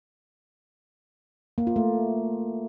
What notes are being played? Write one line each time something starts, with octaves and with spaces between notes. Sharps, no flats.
A#3
F4
A3